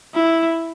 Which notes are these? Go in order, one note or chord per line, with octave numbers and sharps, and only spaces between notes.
E4